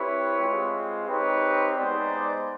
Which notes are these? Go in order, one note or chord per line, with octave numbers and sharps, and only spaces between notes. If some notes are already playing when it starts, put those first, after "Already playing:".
Already playing: C4 E4 G4 B4 C#5
G#3 C4 F4
C4 D#4 G4 B4 C#5
G#3 B3 D#4 C5 D5